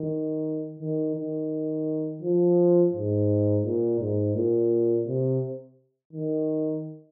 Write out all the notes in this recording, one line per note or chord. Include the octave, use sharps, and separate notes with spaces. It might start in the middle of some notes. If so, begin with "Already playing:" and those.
Already playing: D#3
D#3
D#3
F3
G#2
A#2
G#2
A#2
C3
D#3